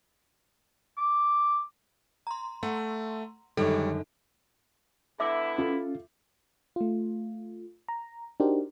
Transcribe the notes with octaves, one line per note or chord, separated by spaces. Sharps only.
D6
A#5 C6
A3 F#5
F#2 D3 D#3 G3 G#3 A4 C#5
D3 B3 E4 E5 D6
C#4 F4 A4
A3 F4
A#5
D4 D#4 F#4 G4 A#4 C5